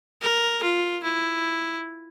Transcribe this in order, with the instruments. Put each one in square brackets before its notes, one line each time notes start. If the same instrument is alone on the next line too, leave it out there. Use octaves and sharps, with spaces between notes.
[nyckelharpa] A#4
F4
E4